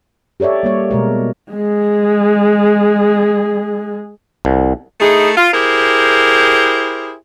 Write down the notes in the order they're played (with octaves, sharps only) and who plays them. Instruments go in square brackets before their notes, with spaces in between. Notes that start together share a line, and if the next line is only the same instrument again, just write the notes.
[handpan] G4 A4 C#5 D5 E5
G3 A#3 C#5
B2 G#3 A#4
[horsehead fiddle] G#3 G#4
[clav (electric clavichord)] C2
[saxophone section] A3 D#4 E4 G#4
F4
E4 G4 G#4 A#4 C5